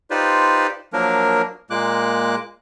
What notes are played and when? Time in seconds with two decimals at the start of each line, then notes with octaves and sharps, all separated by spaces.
0.11 D#4 F4 G4 B4 C5 D5
0.93 F3 F#3 A#3 D4 A#4
1.70 A#2 G#3 A#3 D6 F#6